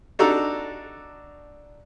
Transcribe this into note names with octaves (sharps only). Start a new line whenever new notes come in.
D4 D#4 F#4 A4 A#5